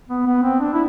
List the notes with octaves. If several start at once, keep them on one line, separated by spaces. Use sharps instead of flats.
B3
B3
C4
D4
E4